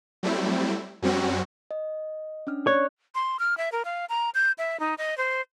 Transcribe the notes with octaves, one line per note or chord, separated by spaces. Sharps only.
F#3 G3 A3 C4 E4
F#2 F#3 G3 C4 C#4 F#4
D#5
C#4 D4 F6
C#5 D5 F#6
C6
F6
E5
A#4
F5
A#5
G6
E5
D#4
D#5
C5